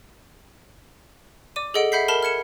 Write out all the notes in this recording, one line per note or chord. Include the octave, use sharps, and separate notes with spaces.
D5 D6 D#7
G#4 A4 D#5 F#5 D7 F#7
E5 F#5 B5 G6 B6 C7
A#4 A5 B5 F6 E7 G7
F6 G#6 C#7 E7